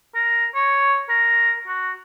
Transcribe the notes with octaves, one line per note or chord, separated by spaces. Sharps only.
A#4
C#5
A#4
F#4